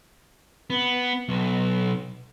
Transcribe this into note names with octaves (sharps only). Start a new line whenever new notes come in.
B3
B1